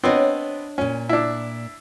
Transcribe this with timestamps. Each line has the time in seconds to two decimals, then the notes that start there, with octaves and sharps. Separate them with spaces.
0.04 B3 C4 D4 C#5 D#5
0.78 A#2 C#4 G#5
1.09 D4 E4